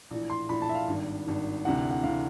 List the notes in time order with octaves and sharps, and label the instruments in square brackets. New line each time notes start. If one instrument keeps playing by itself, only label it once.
[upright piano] A#1 A2 E3
C6
A#1 A2 E3 B5
A5
E5
F5
G#1 G2 D#3
G#1 G2 D#3
D2 C3 E3 F#5
F#5
F#5
D2 C3 E3 F5